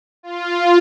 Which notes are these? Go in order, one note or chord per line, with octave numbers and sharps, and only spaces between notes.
F4